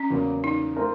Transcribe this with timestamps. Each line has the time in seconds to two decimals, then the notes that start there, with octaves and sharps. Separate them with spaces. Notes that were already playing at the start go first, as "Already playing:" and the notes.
Already playing: C#4
0.10 E2 C#3 F#3 A#3
0.44 D#4
0.76 A3 C4 F4 A#4